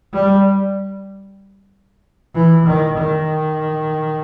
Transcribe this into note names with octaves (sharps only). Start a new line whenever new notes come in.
G3
E3
D#3
D#3